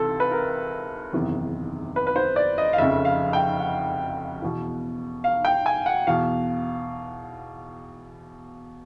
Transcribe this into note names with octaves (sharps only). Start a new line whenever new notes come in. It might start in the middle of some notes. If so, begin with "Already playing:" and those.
Already playing: C#2 C3 E3 A4
B4
A#4
F#1 E2 C3 D#3
B4
B4
C5
D5
D#5
F5
F1 F2 C#3 E5
F5
G5
F#5
E2 B2
F5
G5
G#5
F#5
E2 B2 F5